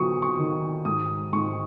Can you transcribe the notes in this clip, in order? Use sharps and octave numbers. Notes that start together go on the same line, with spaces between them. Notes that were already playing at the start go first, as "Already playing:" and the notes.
Already playing: F#3 B3 C#6 D#6
C#6
D#3
G#2 D#6
G#2 C#6